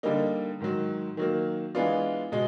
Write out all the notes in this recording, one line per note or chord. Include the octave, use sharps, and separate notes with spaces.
D3 G3 A#3 D#4
G#2 D#3 F#3
D#3 F#3 A#3
E3 G#3 B3 D4 F4
B2 G#3